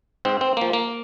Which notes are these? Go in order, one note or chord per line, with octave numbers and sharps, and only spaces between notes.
G#2 C4
C4
F3 A#3
A#3